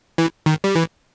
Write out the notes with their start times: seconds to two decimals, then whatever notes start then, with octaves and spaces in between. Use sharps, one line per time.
0.18 E3
0.46 D#3
0.64 G3
0.75 E3